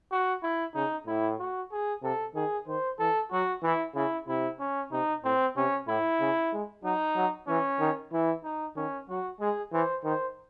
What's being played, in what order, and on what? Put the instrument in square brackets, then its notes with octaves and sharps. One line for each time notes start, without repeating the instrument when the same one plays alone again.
[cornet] F#4
E4
[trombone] C#3 [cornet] D#4
[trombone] A2 [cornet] E4
[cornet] F#4
G#4
[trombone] C3 [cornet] A4
[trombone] D#3 [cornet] G#4
[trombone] D#3 [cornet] C5
[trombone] E3 [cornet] A4
[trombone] F#3 [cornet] F#4
[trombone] E3 [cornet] E4
[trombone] C#3 [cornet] E4
[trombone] C3 [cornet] E4
[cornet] C#4
[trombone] C3 [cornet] D#4
[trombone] A2 [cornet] C4
[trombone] C3 [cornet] C#4
[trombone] A2 [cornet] E4
[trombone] C#3
G#3
[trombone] F#3 [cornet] D#4
[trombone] F#3
[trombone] E3 [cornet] C#4
[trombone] D#3
[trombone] E3 [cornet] E4
[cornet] D#4
[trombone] D#3 [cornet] C#4
[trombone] F#3 [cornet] F#4
[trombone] G#3 [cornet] G#4
[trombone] E3 [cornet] C5
[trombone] D#3 [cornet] C5